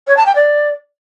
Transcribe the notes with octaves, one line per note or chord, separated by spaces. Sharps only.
C#5
A5
G5
D5